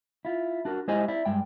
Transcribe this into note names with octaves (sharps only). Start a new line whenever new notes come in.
E4 F4
D4 F#4 A#4
G#3 E4 G4 C5 D#5 G#5
E4 D5
G2 G#3 G5